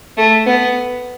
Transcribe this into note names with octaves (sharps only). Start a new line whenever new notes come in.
A3
B3